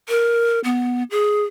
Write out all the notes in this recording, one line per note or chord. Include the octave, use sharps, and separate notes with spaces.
A#4
B3
G#4